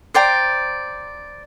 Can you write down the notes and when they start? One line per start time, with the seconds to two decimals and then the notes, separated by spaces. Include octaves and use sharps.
0.14 C5 D5 G5 A#5